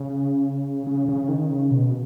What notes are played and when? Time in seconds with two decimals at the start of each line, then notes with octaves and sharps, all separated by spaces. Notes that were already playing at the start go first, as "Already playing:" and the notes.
Already playing: C#3
0.87 C#3
1.09 C#3
1.29 D#3
1.50 C#3
1.71 B2